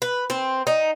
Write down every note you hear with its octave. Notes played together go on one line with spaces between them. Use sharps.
B4
C4
D#4